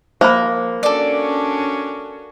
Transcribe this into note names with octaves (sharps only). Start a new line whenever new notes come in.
F3 A#3 C5 B5
C#4 D4 F#4 A4 D5